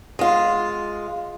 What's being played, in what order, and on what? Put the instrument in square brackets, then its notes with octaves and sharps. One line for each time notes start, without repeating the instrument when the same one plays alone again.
[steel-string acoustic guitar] G#3 F4